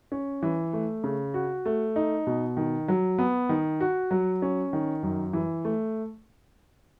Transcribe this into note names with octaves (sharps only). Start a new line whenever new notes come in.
C#4
E3
A3
C#3
F#4
A3
D#4
B2
D#3
F#3
B3
D#3
F#4
F#3
C#4
D#3
F#2
E3
A3